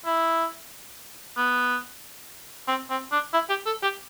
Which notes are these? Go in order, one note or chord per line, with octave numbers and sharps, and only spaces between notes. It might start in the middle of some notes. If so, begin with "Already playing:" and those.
E4
B3
C4
C4
D4
E4
G4
A4
G4